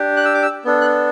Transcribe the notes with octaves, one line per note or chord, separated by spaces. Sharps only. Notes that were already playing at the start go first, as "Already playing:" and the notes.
Already playing: D4 G4
F#6
E6
D6
E6
B3 D4 A4
F#6